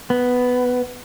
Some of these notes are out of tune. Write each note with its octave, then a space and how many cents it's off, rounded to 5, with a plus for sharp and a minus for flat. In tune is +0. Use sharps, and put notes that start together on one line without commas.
B3 +5